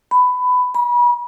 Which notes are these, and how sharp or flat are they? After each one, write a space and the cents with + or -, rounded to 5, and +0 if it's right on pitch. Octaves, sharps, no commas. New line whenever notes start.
B5 +15
B5 -35